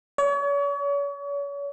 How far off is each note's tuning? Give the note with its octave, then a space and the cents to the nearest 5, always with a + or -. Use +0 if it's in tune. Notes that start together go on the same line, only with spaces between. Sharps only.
C#5 +40